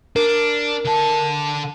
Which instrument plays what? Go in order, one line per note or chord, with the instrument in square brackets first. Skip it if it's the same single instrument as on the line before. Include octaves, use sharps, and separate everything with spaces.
[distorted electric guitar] D4 [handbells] A#4
[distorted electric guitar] D3 A5